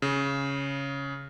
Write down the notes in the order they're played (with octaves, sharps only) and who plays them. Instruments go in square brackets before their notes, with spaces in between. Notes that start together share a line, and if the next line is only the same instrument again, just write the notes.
[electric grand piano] C#3